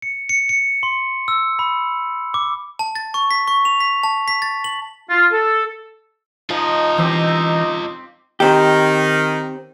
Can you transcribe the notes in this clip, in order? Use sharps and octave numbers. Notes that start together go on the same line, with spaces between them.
C#7
C#7
C#7
C6
E6
B5
D6
A5
A6
C#6
B6
C#6
F7
B6
A5
B6
A6
F#7
F4
A4
F3 D#4 F4 D#5
E3 C4 G4
D#3 C4 G4